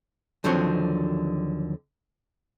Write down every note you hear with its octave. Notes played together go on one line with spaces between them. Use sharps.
D#2 D3 F3 F#3 C4 C#5